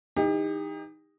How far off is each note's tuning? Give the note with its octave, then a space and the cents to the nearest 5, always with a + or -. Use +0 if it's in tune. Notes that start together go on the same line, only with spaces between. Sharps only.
E3 +0 D#4 +0 G4 +35